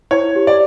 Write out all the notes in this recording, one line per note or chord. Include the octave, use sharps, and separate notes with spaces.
E4 C#5
G4
D5